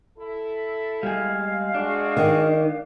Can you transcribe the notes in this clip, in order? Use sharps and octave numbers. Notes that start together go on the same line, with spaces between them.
E4 A4
G3 G#3 G#4 F5
D4 F#4 G#4
D#3